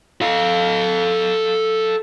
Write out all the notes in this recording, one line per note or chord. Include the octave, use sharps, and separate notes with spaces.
A4 F5